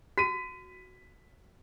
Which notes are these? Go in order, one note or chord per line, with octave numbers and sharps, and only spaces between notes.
F#4 B6 D#7